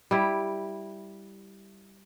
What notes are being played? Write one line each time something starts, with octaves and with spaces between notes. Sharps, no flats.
G3 E4